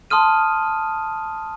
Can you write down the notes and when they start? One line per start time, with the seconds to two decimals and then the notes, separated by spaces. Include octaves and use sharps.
0.10 A5 C6 D#6 F6 D#7